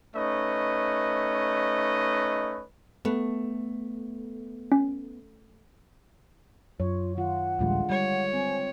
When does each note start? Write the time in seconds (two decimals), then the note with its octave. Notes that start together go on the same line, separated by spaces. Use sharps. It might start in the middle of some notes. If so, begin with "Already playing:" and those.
0.15 A3 C#4 D#4 B4 D#5
3.05 A3 B3
4.72 C#4
6.80 F#2 F4 C#5
7.17 D#3 F4 F#5
7.59 D1 A1 D3 G3 G#3 F4
7.90 G3 C#5
8.33 C4 G#5